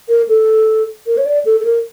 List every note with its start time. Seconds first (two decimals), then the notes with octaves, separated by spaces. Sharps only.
0.09 A#4
0.28 A4
1.07 A#4
1.17 C#5
1.26 D5
1.45 A4
1.60 A4
1.65 A#4